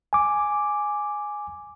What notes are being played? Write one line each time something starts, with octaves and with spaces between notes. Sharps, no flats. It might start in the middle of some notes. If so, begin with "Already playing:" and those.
G#5 D6